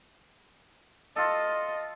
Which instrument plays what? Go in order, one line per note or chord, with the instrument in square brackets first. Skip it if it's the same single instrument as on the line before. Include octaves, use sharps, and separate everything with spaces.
[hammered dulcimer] F4 A4 [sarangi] D#5